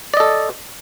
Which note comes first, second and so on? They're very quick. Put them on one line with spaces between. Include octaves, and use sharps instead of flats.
D5 D#5 A4